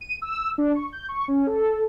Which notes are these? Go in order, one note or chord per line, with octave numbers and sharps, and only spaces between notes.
D#7
E6
D4
C#6
G6
C#6
C#4
A4